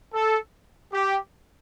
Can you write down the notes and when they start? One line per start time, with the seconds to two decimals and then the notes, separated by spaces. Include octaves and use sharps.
0.13 A4
0.92 G4